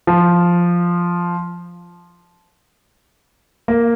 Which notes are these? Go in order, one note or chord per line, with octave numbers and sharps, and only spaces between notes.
F3
A#3